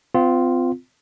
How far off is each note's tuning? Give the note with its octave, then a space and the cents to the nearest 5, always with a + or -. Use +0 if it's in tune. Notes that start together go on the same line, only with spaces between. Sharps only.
C4 -35 F4 +0